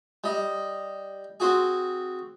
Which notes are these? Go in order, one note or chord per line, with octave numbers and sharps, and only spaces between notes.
G3 D#5
C4 F#4 G#4